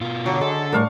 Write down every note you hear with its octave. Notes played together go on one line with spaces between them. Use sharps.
B2 F4
D3 F#3
G#3 A4
A2 G3 D4 A#4 F5 C#6